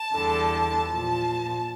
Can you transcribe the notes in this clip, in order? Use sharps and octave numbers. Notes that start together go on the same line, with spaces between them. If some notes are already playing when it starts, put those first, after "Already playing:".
Already playing: A5
E2 D3 G3
A#2 F3 A5